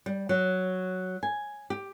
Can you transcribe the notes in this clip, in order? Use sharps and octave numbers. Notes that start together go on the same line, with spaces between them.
G3
F#3
G#5
G4